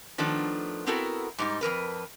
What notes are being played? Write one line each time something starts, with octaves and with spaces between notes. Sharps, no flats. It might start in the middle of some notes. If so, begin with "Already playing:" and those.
D#3 F3 A3 B3 D4
B3 C4 E4 F#4 A4 A#4
G#2 G3 D#4
F2 C#3 A#4 B4